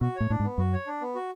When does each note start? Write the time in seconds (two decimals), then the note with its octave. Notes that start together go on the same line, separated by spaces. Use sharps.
0.01 B2 F#4
0.16 A2 C#5
0.30 A2 D4
0.40 G#2
0.45 B3
0.58 F#2 F#4
0.73 C#5
0.87 D4
1.01 B3
1.15 F#4